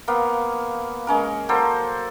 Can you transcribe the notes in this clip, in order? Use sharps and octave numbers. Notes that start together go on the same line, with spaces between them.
A#3 B3 F5
G#3 C#4 A#4
F#3 A#3 A4 C5